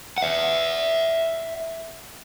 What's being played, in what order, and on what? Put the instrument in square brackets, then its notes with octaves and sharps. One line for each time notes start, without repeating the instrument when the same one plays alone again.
[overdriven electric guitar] E5 F#5